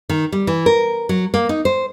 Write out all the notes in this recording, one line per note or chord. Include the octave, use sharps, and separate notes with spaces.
D#3
G3
E3
A#4
F#3
A#3
D#4
C5